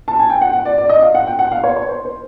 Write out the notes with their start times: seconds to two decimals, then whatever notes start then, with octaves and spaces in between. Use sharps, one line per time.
0.08 A5
0.19 G#5
0.30 G5
0.41 F#5
0.53 F#5
0.65 D5
0.78 D5
0.89 D#5
1.02 F5
1.15 F#5
1.27 G5
1.39 F#5
1.52 F5
1.63 C#5
1.76 C#5
1.89 C5
2.05 C5